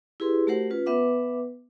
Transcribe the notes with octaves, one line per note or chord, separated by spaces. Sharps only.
E4 G4 G#4 B4 C6
A3 F#4 G4 A#4 C5 F#5
C#4 F4 B4
B3 B4 E5 F#5 D6